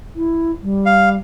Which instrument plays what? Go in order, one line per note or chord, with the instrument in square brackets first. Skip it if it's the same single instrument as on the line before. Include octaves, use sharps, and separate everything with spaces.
[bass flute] E4
G3
[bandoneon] F5